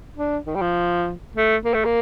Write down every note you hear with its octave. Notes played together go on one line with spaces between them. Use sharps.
D4
D#3
G3
F3
A3
A#3
A3
A#3